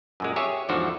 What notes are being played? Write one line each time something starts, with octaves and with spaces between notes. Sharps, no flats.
F#2 A#2 G#3
G4 G#4 C#5 E5
E2 G#2 D3 F3 F#4 A4